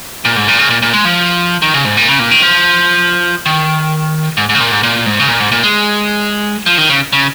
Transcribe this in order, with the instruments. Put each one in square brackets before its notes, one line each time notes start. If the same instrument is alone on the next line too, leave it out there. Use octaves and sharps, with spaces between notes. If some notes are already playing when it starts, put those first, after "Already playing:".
[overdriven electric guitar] A#2
G#2
A#2
C#3
A#2
A#2
G#3
F3
D#3
C#3
G#2
A#2
C#3
A#2
D#3
F3
D#3
G#2
G#2
C#3
A#2
G#2
A#2
G#2
C#3
A#2
G#2
A#2
G#3
F3
D#3
C#3
C#3